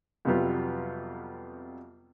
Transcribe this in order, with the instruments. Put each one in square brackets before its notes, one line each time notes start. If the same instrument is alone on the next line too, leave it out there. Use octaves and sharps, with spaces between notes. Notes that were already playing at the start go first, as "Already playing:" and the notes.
[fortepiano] F2 C3 F#3 G3 B3 F4